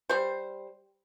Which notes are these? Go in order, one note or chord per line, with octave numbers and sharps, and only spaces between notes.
G3 C5